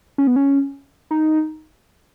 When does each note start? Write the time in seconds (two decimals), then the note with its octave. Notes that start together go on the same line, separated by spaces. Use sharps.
0.18 C#4
0.27 B3
0.36 C#4
1.11 D#4